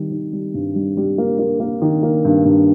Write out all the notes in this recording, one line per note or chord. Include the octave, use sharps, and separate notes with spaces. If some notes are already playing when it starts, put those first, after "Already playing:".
Already playing: D#3 G3
D#3
G3
G2
G3
G3
A#3
A#3
A#3
D#3
A#3
G2
G2